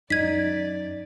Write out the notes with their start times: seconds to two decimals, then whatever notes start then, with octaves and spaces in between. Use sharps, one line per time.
0.10 F#2 D#4 D5 G#6 B6